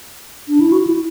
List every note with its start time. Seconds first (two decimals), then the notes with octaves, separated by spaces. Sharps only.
0.48 D4
0.60 E4
0.72 F#4
0.87 E4